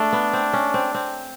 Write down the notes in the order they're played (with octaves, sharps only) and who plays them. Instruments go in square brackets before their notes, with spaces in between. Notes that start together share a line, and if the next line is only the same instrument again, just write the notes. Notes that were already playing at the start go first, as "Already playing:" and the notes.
Already playing: [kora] A3 [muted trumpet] D4
[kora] B3
C4
C#4
C4
C4